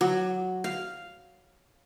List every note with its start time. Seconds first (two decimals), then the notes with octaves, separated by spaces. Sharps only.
0.01 F#3
0.64 F5